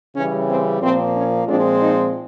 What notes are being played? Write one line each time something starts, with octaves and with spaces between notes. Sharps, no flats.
C#3 E3 G3 C#4
C4
A#2 F3 A#3 C4
C#4
A#2 F3 G#3 C4 D4
D#4